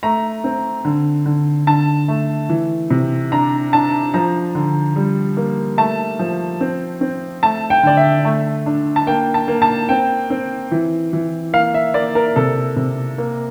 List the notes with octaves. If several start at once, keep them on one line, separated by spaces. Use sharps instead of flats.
A3 A#5
C4
D3
D3
D3 A5
A3
E3
C3
D4 A#5
D4 A5
F3 A#5
D3
G3
A#3
A3 A5
F3
C4
C4
A3 A5
G5
D3 D5
E5
A3
D4
A5
A#3 G5
A5
A#3
A5
C4 G5
C4
E3
E3
A#3 F5
E5
A#3 D5
A#4
C3 A4
C3
A#3